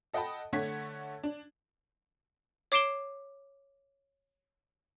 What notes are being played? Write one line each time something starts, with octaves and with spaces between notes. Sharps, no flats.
A4 D#5 F#5 G5 A5 B5
D3 A3 C#5 F#5 G#6 B6
D4
C#5 D6 C7 D7 E7 G7